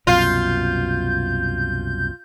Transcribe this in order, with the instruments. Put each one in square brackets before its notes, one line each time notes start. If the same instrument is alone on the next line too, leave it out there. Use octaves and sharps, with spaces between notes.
[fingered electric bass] C2 F#2 B2 [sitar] F4 [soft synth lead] G6